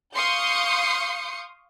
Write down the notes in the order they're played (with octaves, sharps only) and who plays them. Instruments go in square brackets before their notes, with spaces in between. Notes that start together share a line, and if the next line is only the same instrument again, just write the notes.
[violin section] F5 C6 C#6 D#6 G6 C#7